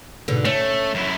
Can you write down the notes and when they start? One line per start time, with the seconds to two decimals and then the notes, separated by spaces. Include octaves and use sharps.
0.28 G#2 B2 D3
0.45 A3 C#4
0.95 F#2 E4